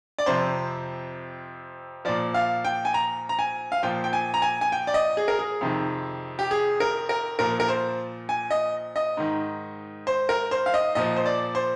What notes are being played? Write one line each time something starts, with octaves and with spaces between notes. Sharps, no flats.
D5
F2 C3 F3 C5
A#2 F3 D5
F5
G5
G#5
A#5
A#5
G#5
F5
A#2 F3 G5
G5
G#5
A#5
G#5
G#5
G5
D5
D#5
G#4
A#4
G#4
F2 C3 D#3
G4
G#4
A#4
A#4
A#2 F3 A#4
A#4
C5
G#5
D#5
D#5
G#2 D#3
C5
A#4
C5
F5
D#5
A#2 F3 D#5
C5
D5
C5